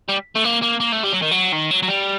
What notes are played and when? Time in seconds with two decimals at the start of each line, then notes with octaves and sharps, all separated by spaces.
0.09 G3
0.35 A3
0.44 A#3
0.62 A#3
0.80 A#3
0.92 A3
1.04 G3
1.13 F#3
1.22 D#3
1.31 F#3
1.52 D#3
1.71 F#3
1.83 F#3
1.88 G3